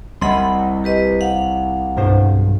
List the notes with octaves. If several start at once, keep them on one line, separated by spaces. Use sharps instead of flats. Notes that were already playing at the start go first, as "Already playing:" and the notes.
C2 D#5 F#5 B5 C6
G4 B4 D#5
F5 F#5
B1 G2 C5